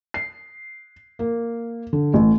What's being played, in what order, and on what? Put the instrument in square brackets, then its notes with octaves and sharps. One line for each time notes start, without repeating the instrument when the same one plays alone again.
[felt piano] C7
A#3
D3
A1